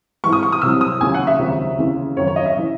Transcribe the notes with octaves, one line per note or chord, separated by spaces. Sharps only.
G#2 E3 C#6
D#6
C#6
D#6
C2 C3 F#3 E6
D#6
D#2 C#3 F#3 G#5
F#5
E5
C#2 C3 D#3 F#3
D#2 C#3 E3
F#2 D#3 F#3 C#5
C#5
D#5
E5
C#3 E3